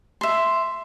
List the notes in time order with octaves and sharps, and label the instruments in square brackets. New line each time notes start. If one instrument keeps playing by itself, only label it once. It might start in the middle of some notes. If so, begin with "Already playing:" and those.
[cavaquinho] E5 C6